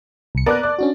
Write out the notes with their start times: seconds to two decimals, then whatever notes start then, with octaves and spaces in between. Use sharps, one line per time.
0.35 C2 C#7
0.46 B3 A#4 D5 A5 D6 F#6
0.63 D5
0.79 C#4 D4 F#4